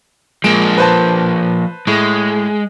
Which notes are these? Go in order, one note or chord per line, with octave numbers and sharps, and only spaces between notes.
F3 G#3 A#3 D7 E7
B4 C5 A5
A2 G#3